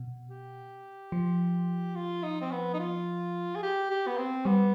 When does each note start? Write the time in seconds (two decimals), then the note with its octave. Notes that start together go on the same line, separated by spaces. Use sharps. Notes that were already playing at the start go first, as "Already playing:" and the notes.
Already playing: B2
0.29 G4
1.12 F3
1.95 F4
2.23 D#4
2.42 C4
2.51 B3
2.74 D#4
2.79 F4
3.56 G#4
3.63 G4
3.91 G4
4.07 B3
4.18 C4
4.45 G3 B3